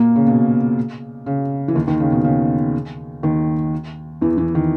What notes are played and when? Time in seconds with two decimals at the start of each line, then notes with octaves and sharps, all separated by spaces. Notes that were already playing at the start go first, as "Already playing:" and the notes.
Already playing: A#2 A#3
0.16 C#3
0.28 B2
1.26 C#3
1.68 E3
1.75 D#2 D#3
1.87 D#2 D#3
2.00 C#3
2.12 B2
2.24 C#3
3.23 D#2 D#3
4.21 E2 E3
4.37 E2 E3
4.55 D#3